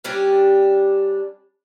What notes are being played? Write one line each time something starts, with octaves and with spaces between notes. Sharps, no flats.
G3 C#4 D4 G4